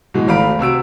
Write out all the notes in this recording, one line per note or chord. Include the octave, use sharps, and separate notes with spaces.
B2 E3 G#3
G#1 A3 F5 A#5 B5 D7
C3 F#4 E6 D7